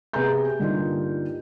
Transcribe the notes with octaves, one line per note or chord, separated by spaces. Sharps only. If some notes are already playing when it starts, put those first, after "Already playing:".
C3 B3 G#4 G#5 A#5 G6
G2 D3 G3 A#3 D#4 F4